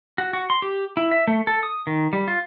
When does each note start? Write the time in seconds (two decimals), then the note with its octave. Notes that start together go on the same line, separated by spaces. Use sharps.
0.18 F#4
0.33 F#4
0.50 C6
0.62 G4
0.97 E4
1.11 E5
1.27 A3
1.47 A4
1.63 D#6
1.87 D#3
2.13 G3
2.28 F4